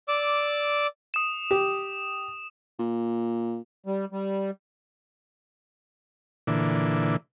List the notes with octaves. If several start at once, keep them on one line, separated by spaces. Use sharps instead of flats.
D5 D6 E6
D#6 E7
G4
A#2
G3
G3
A#2 D3 E3